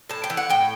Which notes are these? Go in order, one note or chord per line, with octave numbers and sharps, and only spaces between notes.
A2 A5
G5
E3
F#5
A2 G5